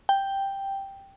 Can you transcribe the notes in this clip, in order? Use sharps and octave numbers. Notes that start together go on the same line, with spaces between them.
G5